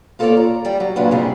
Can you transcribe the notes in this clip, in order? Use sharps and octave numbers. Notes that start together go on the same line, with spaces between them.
A#3 F4 A4 B4 C#5 D5
A#5
G3 D5 G5
F#3
A#2 C#3 F#3 D4 B4
G#2 C3 G3 C4 D4 G#4